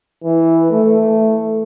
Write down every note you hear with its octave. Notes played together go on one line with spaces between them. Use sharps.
E3
A3